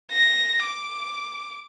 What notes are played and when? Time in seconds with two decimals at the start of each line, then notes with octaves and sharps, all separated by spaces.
0.11 A#6
0.64 D6